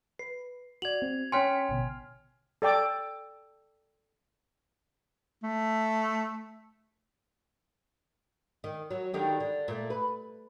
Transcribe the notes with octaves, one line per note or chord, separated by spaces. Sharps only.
B4 C7
F#4 D5 G#6 F7 F#7
C4
C#4 C#5 G5 G#5 C6 F6 B6 C#7
A1 B2 D3
A4 D5 G5 D6
A3
D#3
F#3
D3 D#3 G3
D3
A#2 A3
B4